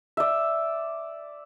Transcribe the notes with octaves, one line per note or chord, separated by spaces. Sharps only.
D5 E5